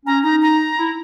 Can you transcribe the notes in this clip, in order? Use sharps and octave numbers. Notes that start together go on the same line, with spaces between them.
C#4 A#5
D#4 A#5
A#5
E4